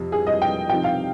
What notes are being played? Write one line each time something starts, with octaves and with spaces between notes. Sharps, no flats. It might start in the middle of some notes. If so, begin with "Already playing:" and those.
Already playing: F2 C3
G#4
D#5
G5
C3 F3 C4 D#4 G5
F5